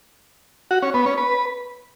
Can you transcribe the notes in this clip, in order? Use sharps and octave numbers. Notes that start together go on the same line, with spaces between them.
F#4
C#4
B3
C#4
B4